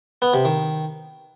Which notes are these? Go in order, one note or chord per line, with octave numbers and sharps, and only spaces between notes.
B3
C3
D#3